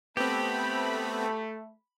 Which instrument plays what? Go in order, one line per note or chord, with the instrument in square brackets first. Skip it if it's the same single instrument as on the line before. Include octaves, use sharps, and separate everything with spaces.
[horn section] A3 [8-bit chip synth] B3 C4 [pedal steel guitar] G4 [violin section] B5